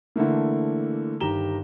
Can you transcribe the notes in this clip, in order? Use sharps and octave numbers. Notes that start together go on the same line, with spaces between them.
D3 E3 A3 A#3
G1 D#3 G4 A#5 E7 G7